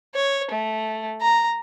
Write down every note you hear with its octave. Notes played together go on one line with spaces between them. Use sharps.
C#5
A3
A#5